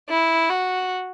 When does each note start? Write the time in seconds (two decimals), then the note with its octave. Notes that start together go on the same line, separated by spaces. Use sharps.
0.10 E4
0.49 F#4